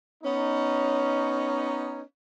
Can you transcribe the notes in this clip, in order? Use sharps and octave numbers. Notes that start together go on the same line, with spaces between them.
B3 C#4 D#4